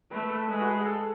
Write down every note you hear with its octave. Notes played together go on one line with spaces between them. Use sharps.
A3 B4
A4
G#3 B4
F#4
G#4
G#4
A4